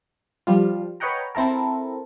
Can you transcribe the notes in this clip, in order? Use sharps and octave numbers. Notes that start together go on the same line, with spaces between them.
F3 G3 F4
B4 C#5 D#5 F#5 G5 A#5
C4 E4 A4 A#4